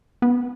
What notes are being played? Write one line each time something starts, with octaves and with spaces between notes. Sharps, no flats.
B3